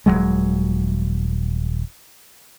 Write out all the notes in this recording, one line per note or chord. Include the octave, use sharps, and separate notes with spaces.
D#1 E2 F#3 G#3